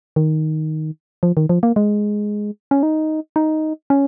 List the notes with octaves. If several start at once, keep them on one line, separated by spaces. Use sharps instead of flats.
D#3
F3
D#3
F3
A#3
G#3
C#4
D#4
D#4
C#4